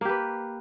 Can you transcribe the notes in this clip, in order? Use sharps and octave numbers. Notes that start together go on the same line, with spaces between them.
A#3 G4 B4